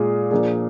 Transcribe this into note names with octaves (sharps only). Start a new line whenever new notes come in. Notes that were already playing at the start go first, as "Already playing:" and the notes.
Already playing: A#2 G#3 F4 G#4
A#2 F3 A#3 D4 G#4